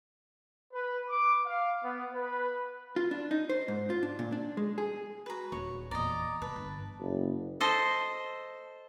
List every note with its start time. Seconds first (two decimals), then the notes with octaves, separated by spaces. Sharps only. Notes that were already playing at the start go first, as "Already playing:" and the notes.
0.73 B4
1.08 D6
1.45 F5
1.84 B3
2.14 B4
2.96 F4
3.11 D4
3.31 D#4
3.49 C5
3.68 G#2
3.90 F4
4.03 D4
4.19 A#2
4.32 D4
4.57 G#3
4.78 G#4
5.26 F#4 B4 A#5
5.52 D#1 C#5
5.91 E2 A#2 D5 D#5 A#5
6.42 C3 B4 A5
6.56 G1
7.00 F#1
7.60 A4 C5 D#5